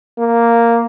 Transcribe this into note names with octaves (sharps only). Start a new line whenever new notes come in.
A#3